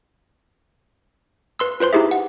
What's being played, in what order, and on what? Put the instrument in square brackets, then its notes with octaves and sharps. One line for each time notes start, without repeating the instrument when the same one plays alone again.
[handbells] B4 C6 E6
F4 B4 C5 C6
D#4 E4 G4 G#4 E5
F#5